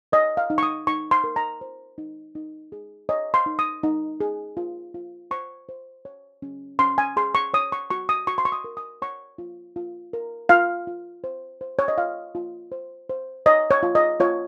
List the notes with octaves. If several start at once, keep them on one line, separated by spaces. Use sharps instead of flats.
C#5 D#5
F5
D#4
C#6
D#6
D#4 C#6
C6
A#4
A#5
C5
D#4
D#4
G#4
C#5 D#5
C6
D#4
D#6
D#4
G#4
F4
F4
C5 C#6
C5
C#5
C#4
C#4 C6
G#5
G#4 C6
C#6
C#5 D#6
C#6
F#4 C#6
D#6
F#4 C#6
C6
C#6
D#6
A#4
D#6
C#5 C#6
F4
F4
A#4
F4 F5
F4
C5
C5
C#5
D#5
F4 F5
F4
C5
C5
C#5 D#5
C#5
F4
D#5
F4 C#5